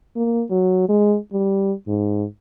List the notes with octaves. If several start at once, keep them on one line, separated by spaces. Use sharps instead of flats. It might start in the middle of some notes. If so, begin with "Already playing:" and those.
A#3
F#3
G#3
G3
G#2